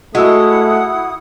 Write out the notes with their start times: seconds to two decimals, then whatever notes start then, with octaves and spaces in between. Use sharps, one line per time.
0.15 G#3 A3 E4 F#4 F#5 D#6 E6